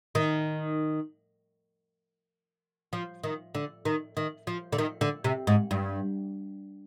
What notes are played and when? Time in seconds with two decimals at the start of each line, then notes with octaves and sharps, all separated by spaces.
0.15 D#3
2.93 F3
3.24 D#3
3.55 D3
3.85 D#3
4.17 D#3
4.47 F3
4.73 D3
4.78 D#3
5.01 D3
5.24 C3
5.47 G#2
5.71 G2